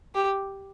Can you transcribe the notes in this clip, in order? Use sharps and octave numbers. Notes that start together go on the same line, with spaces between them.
G4